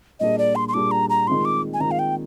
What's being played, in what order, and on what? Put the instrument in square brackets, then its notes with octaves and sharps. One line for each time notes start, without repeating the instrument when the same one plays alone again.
[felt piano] A#2 G3 A#3 D4 G#4 [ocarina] D#5
[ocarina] D5
C6
C6
[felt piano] A#2 G3 A#3 D4 G#4 [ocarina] D6
[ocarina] A#5
A#5
[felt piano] D#3 G#3 C4 F4 [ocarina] C6
[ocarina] D6
G#5
[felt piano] D#3 G#3 C4 F4 [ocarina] A#5
[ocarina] F5
G5